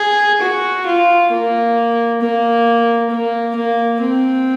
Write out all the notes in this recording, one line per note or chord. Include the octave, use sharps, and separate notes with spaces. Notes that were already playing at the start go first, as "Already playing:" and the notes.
Already playing: G#4
F#4
F4
A#3
A#3
A#3
A#3
C4